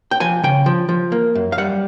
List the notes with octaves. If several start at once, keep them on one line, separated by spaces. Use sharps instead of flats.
G5
F3 G#5
C#3 G5
F3
F3
A#3
F#2
F5
G3 F#5